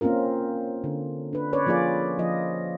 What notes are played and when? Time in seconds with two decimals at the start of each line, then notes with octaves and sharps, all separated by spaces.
0.01 A#3 C4 C#4 F4 A#4
0.84 D3
1.33 D4 B4
1.53 C#4 B4 C#5 D5
1.66 F3 A#3 F4 G#4 D5
2.19 F3 F4 D#5